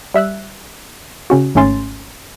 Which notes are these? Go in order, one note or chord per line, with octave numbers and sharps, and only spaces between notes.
G3 E5 E6 F#6
C#3 C#4 F#4
G#1 G#2 A3 C#4 C6 A6